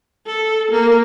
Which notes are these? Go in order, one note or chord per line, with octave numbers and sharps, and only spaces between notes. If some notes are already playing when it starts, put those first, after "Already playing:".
A4
A#3